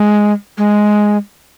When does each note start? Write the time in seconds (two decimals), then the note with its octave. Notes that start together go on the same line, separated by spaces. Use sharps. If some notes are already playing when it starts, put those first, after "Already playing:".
Already playing: G#3
0.58 G#3